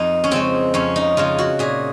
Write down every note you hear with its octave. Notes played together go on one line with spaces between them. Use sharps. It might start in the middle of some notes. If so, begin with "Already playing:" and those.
Already playing: F2 D#4
C#4
C#3 G#3 C4
F2 C#4
D#4
C#3 G#3 F4
F#4
A#2 G#4